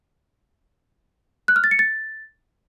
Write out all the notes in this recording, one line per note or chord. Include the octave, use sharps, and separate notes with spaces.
F#6
F6
A6
C#7
A6